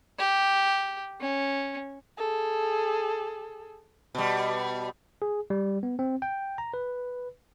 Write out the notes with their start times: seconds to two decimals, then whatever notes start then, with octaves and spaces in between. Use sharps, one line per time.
0.19 G4
1.20 C#4
2.18 G#4 A4
4.15 B2 G3
5.22 G#4
5.50 G3
5.83 B3
5.99 C4
6.22 G5
6.58 A#5
6.74 B4